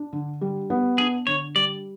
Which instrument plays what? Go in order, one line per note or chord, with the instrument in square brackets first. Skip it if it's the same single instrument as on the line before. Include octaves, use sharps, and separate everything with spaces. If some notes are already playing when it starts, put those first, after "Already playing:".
Already playing: [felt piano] D4
D3
G3
B3
[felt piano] D4 [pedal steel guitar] G#4
[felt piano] D3 [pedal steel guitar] C#5
[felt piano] G3 [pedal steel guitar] D5